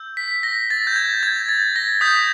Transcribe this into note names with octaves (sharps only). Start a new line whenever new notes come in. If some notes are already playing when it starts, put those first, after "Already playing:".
Already playing: E6 G6
B6
A#6
A6
G6
G#6
G#6
A6
A#6
D#6 G6 B6